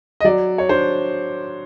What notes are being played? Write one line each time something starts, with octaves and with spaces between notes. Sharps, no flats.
D#5
F#3 D5
C#5
D4 C5